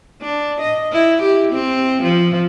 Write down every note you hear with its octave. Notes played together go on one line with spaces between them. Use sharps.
D4
D#5
E4
G4
C4
F3